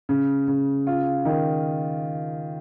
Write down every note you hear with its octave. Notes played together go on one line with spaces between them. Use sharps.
C#3
C#3
F4
D#3